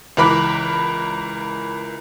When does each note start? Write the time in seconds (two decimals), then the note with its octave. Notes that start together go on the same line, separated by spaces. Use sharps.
0.17 C#2 E3 A#4 B5 D6 F#6